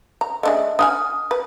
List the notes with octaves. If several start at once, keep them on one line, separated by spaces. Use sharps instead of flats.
A#5
A3 D4 G#4 D#5 E5
D4 F#5 G#5 D#6 F6
B4